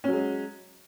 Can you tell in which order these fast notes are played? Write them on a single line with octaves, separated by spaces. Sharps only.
C#4 F#3 G#3